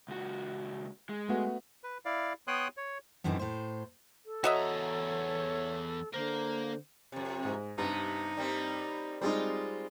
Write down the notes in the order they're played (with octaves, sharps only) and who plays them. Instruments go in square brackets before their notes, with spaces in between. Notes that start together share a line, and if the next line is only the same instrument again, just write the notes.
[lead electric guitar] C#2 F#4
G#3
[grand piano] A3 B3 F#4
[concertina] B4
E4 D5 F5
B3 C#5 G5 C6 D#6 F#6
C#5
[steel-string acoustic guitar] F#2 A2 E3 C4 C#4 D#4
A2 C5
[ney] A4
[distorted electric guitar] E2 A#5 [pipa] F#4 D#5 E5 [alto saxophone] C#5
[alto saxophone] D3 [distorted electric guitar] A#3 A#4 [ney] C5
[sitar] F2 C3
[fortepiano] G#2
[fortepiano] G2 [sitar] C3 B3 [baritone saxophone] D#4
[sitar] G3 A#3 C4
[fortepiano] G3 G#3 D#4 [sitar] C4 F4